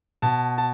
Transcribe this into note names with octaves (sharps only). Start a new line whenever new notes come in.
B2 A5
A5